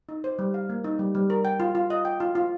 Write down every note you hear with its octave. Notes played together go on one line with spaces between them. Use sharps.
D#4
C5
G3
F5
A#3
D#4
G3
G3
A#4
G5
F4
F4
D#5
G5
F4
F4